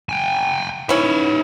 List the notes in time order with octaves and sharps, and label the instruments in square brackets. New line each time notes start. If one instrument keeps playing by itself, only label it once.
[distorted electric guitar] G5 G#5
[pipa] E3 C#4 [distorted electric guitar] D#4 E5